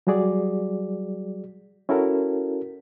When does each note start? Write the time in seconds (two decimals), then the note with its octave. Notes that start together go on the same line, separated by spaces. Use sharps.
0.07 F#3 G3 F#4 G#4 D5
1.89 C#4 E4 F#4 A4 A#4